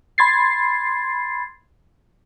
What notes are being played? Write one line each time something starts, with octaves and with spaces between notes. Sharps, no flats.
B5 C6 G#6 A6 C7